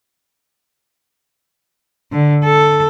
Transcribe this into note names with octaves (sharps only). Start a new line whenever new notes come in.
D3
A4